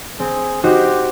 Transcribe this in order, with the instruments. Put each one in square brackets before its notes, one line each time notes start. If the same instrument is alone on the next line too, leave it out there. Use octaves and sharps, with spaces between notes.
[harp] C4 [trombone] G#4
[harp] D#4 F#4 C5 [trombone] G4